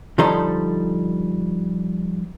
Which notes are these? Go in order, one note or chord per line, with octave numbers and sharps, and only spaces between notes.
D3 F3 G3 D#4 A4 C6